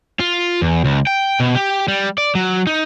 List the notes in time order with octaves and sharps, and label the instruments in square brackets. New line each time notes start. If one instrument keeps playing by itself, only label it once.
[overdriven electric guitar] F4
E2
C#2
G5
B2
G4
G3
D5
F#3
D#4